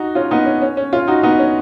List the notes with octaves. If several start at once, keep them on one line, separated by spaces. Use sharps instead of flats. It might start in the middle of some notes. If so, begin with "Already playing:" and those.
Already playing: D#4 F#4
C#4 F4
B3 D#4
C#4
C#4
C#4
C#4 F4
D#4 F#4
B3 D#4
C#4